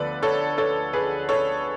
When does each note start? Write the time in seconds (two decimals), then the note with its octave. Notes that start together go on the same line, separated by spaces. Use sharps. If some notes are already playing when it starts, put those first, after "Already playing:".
Already playing: D2 D3 F3 B3 A4 B4 D5
0.23 A4 C#5
0.58 A4 C#5
0.93 G#4 B4
1.29 A4 C#5